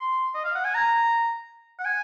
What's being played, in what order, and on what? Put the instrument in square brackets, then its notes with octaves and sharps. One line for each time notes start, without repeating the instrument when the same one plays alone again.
[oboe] C6
D#5
F5
F#5
G#5
A#5
F#5
G#5